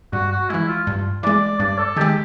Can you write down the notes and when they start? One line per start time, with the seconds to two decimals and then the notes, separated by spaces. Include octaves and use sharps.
0.13 G2 F#4
0.32 F#4
0.50 E3 G#3 E4
0.68 F4
0.87 G2
1.23 E3 G#3 D5
1.59 G2 D5
1.78 A4
1.96 D#3 G#3 G4